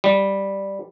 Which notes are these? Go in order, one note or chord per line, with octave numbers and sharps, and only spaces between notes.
G3